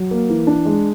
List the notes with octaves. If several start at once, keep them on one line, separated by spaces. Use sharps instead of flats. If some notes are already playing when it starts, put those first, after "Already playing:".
Already playing: F#3
A#3
E3
D4
G#3